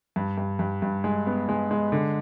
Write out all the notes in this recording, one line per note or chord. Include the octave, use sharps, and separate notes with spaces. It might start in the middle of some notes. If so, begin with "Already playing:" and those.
G2
G2
G2
G2
G#3
B3
G#3
G#3
D3